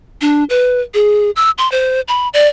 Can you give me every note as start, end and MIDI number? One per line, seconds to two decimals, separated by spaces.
0.21 0.44 62
0.50 0.81 71
0.94 1.30 68
1.36 1.50 88
1.58 1.70 84
1.72 2.01 72
2.08 2.28 83
2.34 2.48 74